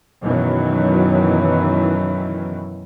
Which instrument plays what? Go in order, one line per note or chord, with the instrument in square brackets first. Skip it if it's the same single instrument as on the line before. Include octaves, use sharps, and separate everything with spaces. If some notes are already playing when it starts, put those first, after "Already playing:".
[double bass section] F#2 B2 D#3 E3 F#3